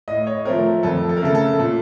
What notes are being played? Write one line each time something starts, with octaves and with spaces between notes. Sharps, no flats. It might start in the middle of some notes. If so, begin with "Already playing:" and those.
A2 D#5
C#5
F3 A3 C4 A#4
F2 A4
A4
A#4
C#3 A3 A4
A4
A#2 A4